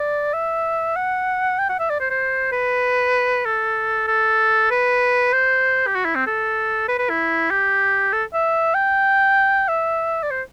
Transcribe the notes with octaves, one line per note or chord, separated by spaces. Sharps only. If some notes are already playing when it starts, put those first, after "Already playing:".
Already playing: D5
E5
F#5
G5
F#5
E5
D5
C5
C5
B4
A4
A4
B4
C5
G4
F#4
E4
C4
A4
B4
B4
E4
G4
A4
E5
G5
E5
D5
C5